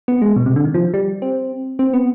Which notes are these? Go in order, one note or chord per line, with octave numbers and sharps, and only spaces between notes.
B3
G#3
B2
C3
D3
D#3
F3
G3
C4
C4
B3